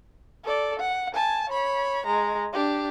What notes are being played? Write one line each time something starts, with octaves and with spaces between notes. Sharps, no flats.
A4 D5
F#5
G#5 A5
C#5 B5
G#3 A#5
D4 G4